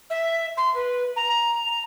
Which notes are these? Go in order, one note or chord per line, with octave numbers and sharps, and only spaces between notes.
E5
C6
B4
A#5